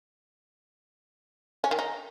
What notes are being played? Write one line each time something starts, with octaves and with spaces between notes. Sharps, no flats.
C#4
D#3
D#4